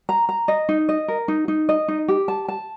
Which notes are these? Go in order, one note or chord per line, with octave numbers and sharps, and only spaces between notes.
A#5
A#5
D#5
D#4
D#5
A#4
D#4
D#4
D#5
D#4
G4
A5
A5